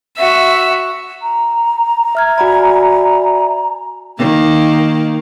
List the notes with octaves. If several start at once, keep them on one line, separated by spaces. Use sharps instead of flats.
F#4 E5 E6
A#5
E5 F6 G#6
F#4 D5 E5 F#5 G#5 B5
D#3 A#3